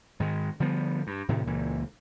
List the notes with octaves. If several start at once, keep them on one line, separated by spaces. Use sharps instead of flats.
G#2 D#3 G#3
D3 F3 G3 B3
G2
A2 C3 D#3
C#2 A#2 E3